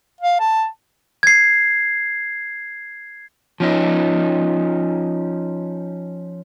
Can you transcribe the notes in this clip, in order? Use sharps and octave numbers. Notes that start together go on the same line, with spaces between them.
F5
A5
G#6 C7
F3 C#4 D#4